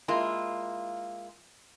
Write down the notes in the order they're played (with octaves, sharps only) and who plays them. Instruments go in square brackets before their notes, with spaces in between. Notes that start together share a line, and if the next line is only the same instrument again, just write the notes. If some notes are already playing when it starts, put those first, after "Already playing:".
[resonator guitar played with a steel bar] G#3 A#3 E4 F4